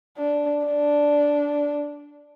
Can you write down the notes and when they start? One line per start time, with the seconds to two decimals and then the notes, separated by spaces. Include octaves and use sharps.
0.17 D4
0.65 D4